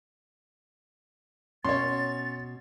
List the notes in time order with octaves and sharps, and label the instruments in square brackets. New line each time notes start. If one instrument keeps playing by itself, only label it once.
[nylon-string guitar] B2 [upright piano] C#4 [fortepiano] C#5 C6 [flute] A6